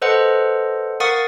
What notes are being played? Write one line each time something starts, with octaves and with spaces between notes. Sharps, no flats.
A4 B4 C5 D#5 F#5
A#4 F5 F#5 C#6 D#6 A6